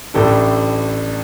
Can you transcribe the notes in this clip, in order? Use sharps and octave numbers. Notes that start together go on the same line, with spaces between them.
A1 A2 A3 D4 A4